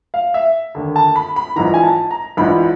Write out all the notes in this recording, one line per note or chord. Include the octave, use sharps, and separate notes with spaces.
F5
E5
D#2 D3
A5
B5
B5
A#1 G#2 E3 A#5
G#5
A5
A#5
A#1 G#2 E3 B5